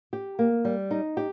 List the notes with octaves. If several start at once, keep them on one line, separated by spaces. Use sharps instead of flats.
G4
A#3
G3
D#4
G4